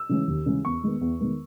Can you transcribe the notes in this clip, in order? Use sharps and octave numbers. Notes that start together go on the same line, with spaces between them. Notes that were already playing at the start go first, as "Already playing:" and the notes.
Already playing: E6
C#3 E3 G#3 C#4
D#2
C#3 E3 G#3 C#4
E2 C#6
D#3 G#3 B3
E2
D#3 G#3 B3